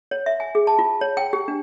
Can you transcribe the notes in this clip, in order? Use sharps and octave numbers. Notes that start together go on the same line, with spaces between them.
C#5
E5
G#5
G#4
A5
F4
C#5
G5
G4
D4